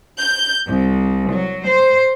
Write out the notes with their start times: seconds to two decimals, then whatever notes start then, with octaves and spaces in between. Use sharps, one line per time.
0.20 G6
0.68 C2
1.31 F#3
1.66 C5